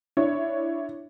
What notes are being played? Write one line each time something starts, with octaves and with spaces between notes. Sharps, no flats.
D4 E4 C#5